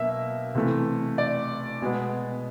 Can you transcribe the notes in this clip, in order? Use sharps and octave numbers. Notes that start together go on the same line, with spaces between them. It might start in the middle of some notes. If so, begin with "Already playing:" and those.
Already playing: B2 F#3 A#3 E5
C3 E3 A3
D5
B2 G#3 B3